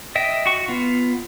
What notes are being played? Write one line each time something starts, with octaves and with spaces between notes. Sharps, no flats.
D#5 E5 G5
F#4 C#6
B3 F4